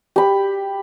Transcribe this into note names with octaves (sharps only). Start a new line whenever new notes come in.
G4 B5